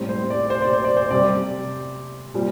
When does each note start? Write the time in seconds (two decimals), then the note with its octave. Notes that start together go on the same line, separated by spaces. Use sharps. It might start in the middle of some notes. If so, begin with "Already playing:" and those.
Already playing: A2 G3 C4
0.09 C5
0.30 D5
0.50 C5
0.62 D5
0.73 C5
0.84 D5
0.97 C5
1.11 C3 G3 C4 D5
2.34 A#2 G3 C4